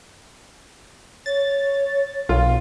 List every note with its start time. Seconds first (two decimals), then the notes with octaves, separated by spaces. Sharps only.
1.26 C#5 A6
2.29 B1 F4